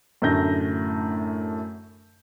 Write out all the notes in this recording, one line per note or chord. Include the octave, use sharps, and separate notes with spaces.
F#2 A2 D3 A3 G6 A#6